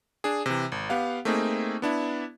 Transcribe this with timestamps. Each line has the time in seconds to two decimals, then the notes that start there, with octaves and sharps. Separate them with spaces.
0.24 D4 G#4
0.46 C3 E3
0.72 G#1
0.89 B3 G4 F5 F#5
1.25 A3 A#3 C4 D#4 G#4
1.82 B3 D4 E4